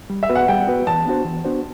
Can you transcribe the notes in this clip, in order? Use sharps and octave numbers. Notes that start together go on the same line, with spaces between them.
G3
E5
B3 F#4 B4
F#5
G3 G5
B3 F#4 B4
E3 A5
B3 D4 F#4 C5
E3
B3 D4 F#4 C5